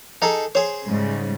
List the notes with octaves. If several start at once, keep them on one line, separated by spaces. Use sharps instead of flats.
D#4 G#4 A4 A#5
G#4 C5 C#5
G#2 C#3 G3